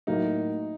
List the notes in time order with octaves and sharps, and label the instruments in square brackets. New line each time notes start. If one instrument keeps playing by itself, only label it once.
[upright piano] A2 F#3 A#3 [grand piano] D#4